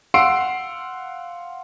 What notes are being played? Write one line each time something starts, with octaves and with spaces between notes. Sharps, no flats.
F5 F#5 C6 E6 C7 D7